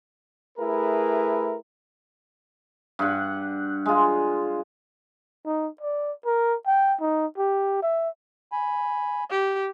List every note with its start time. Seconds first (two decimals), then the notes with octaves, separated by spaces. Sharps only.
0.59 A3 E4 G#4 A#4 B4
2.99 G2 F#5
3.86 G#3 F4
5.46 D#4
5.81 D5
6.25 A#4
6.67 G5
7.01 D#4
7.38 G4
7.82 E5
8.52 G#5 B5
9.30 G4